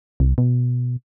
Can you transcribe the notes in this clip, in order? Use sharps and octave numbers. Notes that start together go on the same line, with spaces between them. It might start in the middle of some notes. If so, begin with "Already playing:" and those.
C2
B2